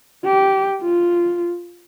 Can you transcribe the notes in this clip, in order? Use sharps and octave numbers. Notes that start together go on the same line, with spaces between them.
G4
F4